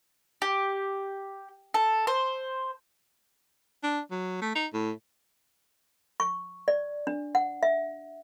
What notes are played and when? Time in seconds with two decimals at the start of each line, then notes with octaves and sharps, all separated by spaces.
0.42 G4
1.74 A4
2.07 C5
3.83 D4
4.11 F#3
4.42 A3
4.55 D#4
4.73 A2
6.20 C#6
6.68 D5
7.07 D4
7.35 F#5
7.63 E5